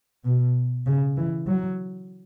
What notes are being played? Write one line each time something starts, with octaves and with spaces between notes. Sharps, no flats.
B2
C#3
E3
F#3